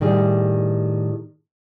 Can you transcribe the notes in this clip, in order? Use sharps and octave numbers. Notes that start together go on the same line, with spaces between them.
A2 D#3 G3 G#4